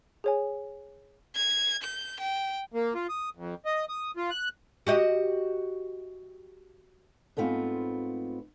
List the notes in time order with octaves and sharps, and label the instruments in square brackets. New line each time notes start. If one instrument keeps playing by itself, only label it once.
[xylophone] G#4 C#5 G#5
[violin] G#6
G6
G5
[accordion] A#3
F4
D#6
F2
D#5
D#6
F4
F#6
[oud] F#4 G4 D#5
[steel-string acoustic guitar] G#2 A3 B3 C4 F4